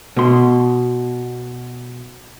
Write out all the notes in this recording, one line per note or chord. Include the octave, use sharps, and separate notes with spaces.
B2 C6